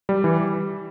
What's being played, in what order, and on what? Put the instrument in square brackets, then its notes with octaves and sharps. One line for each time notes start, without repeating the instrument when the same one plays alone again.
[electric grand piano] G3
E3